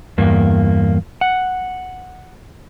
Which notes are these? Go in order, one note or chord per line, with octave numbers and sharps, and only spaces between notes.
E2 G2 A#3
F#5